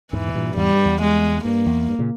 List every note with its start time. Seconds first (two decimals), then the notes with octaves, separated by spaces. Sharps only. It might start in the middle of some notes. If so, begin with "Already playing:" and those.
0.13 E2 G#2 E3
0.28 B2
0.34 G2 A#2
0.56 E2 G#2 G3
0.71 G2
0.85 E2
1.01 G#3
1.44 G2 A#3
1.66 E2
1.88 G2
1.99 A#2 C#3